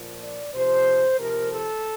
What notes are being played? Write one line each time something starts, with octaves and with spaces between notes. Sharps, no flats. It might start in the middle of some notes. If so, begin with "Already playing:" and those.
Already playing: A#2 F3
D5
C3 F3 C5
C3 F3 A#4
A4